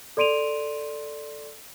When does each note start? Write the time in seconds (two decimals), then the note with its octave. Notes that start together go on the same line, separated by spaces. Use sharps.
0.17 A4 D5 C6 D7 D#7 F7